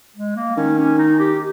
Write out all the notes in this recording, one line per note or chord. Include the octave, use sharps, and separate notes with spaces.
G#3
A#3
D#3 C#4
C#4
D#4
G4